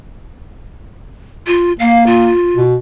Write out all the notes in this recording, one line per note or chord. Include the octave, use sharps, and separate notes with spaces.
F4
A#3 F5
F4
B2